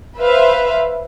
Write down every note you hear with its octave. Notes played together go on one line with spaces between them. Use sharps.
B4 C5 E5 F5